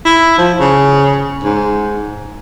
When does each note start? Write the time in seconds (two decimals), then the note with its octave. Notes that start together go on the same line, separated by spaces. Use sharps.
0.05 E4
0.39 F3
0.60 C#3
1.44 G#2